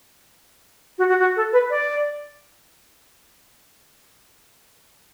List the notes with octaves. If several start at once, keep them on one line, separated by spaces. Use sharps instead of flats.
F#4
F#4
F#4
A4
B4
D5